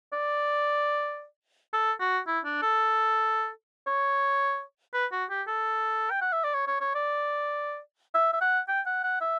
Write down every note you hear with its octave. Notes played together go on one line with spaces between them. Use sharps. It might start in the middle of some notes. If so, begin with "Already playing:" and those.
D5
A4
F#4
E4
D4
A4
C#5
B4
F#4
G4
A4
G5
F#5
E5
D5
C#5
C#5
C#5
D5
E5
E5
F#5
G5
F#5
F#5
E5